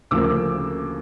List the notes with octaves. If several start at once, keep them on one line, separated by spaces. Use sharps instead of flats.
D2 C#3 F3 A#3 D6 E6